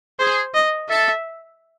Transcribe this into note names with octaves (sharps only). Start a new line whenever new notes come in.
G#4 C5
D#5
A4 E5